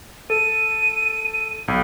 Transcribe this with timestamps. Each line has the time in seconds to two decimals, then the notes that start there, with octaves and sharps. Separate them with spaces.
0.30 A4 D#7
1.68 B1